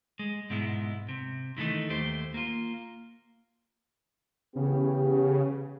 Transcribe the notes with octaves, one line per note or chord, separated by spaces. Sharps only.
G#3
G#2 B2 G#3 E4
C3
D#3 E3 G3 A3 D#4
D#2 A3 G4 C5
A#3 F4
C#3 E3 B3 G4